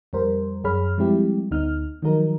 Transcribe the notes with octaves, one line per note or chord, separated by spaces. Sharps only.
F2 G3 A#4 C5
F#2 G#4 C#5 B5 F6
F3 G3 G#3 C4 E4 G4
D2 B3 D#4 F6
D#3 F3 F#3 D#4 A#4